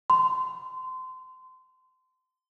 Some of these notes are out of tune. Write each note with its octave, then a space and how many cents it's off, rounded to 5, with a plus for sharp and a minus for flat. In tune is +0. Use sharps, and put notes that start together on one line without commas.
C6 -25